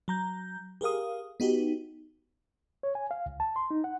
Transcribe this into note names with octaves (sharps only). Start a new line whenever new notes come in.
F#3 A#5 G6
G4 G#4 A#4 F5 D#6
B3 D#4 F#4 G4
C#5
G#5
F5
C#2
A5
C6
D#4
F#5